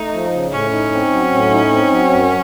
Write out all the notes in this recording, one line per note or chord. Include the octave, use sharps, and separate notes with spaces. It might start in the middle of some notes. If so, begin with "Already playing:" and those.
Already playing: A3 D#4
F3
C#3
A2 C#4
D#4
C4
F#3
A2
D#4
C4
F#3
F#2